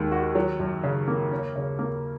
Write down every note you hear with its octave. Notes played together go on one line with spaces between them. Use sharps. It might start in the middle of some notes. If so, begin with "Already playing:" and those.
Already playing: D#2 D#3 G#3
F#4
F#3
F#2
C#3
A#3
C#4
C#3
A#3